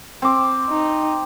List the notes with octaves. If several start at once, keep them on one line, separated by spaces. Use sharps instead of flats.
C4 D6
D#4